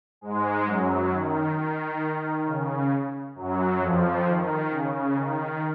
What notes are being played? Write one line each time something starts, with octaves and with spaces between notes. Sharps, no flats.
G#2 G#3
F#2 F#3
D#3
D#3
C#3
F#2 F#3
F2 F3
D#3
C#3
D#3